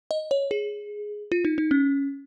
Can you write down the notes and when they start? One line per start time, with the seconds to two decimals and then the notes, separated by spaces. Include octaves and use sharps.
0.11 D#5
0.31 C#5
0.51 G#4
1.32 F4
1.45 D#4
1.58 D#4
1.71 C#4